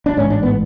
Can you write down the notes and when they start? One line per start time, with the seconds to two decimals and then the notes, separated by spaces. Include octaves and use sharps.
0.06 D4
0.17 A1 G#2 C#4
0.30 D4
0.43 B3